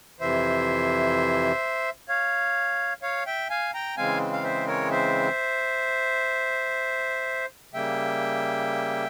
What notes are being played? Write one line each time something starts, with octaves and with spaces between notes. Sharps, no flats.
F2 C3 E3 C5 E5
C#5 F5
C#5 F5
E5 G5
F5 G#5
G5 A#5
C#3 E3 G#3 C4 F5 G#5
F5
C5 E5
A#4 C#5
C5 E5
C#3 G3 A#3 E5 G5